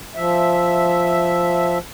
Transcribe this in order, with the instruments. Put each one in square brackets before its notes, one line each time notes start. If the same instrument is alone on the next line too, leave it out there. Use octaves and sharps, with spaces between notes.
[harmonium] F3 E5